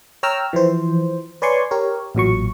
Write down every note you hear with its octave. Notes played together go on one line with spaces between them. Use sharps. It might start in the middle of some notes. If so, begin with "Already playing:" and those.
C#5 G5 A#5 E6 F6
E3 F3 C5
B4 C#5 D5 G#5 C6 C#6
G4 A#4 C#5
A1 A#2 F#3 C#6